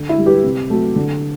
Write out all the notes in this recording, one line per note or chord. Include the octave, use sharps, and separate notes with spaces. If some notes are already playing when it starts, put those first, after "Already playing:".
Already playing: D3
E4
G3
G4 B4
C3
F#3 A3
D3